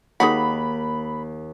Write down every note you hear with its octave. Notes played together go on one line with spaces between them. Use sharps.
D#2 G#3 D#4 F#4 B5